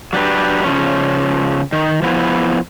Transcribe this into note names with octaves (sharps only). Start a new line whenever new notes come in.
F#3 D4 G4 B4
C#3 F3 C#4
D#3
F3 B3 E4